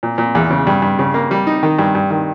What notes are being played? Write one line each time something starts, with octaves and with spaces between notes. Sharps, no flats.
A#2
A#2
E2
C#3
G2
G2
C#3
A#3
G3
D#4
D#3
G2
G2
D#3